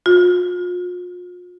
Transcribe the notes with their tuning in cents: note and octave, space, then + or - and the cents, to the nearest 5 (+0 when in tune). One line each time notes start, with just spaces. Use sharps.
F4 +40